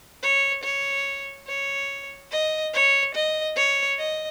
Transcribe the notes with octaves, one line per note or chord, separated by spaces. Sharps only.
C#5
C#5
C#5
D#5
C#5
D#5
C#5
D#5